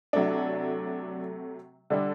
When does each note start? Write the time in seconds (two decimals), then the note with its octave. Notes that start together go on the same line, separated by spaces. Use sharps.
0.13 C3 F#3 A3 D4
1.90 D3 G3 D4